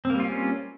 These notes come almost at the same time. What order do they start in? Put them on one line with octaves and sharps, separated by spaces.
C4 A#3 G3 F4 C#4